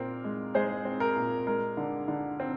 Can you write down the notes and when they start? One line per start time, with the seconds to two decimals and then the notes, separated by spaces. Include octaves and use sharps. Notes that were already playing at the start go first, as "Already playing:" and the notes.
Already playing: A#2 C4 A#4
0.24 G#3
0.54 G#3 G#4 C5
0.85 C4
1.00 A#4
1.16 A#2
1.47 G#3 A#4
1.77 D3
2.08 D3
2.40 C4